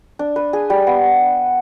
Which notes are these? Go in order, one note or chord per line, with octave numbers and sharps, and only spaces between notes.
D4
B4
G#4
G3
B3